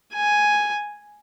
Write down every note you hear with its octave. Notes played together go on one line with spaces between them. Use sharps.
G#5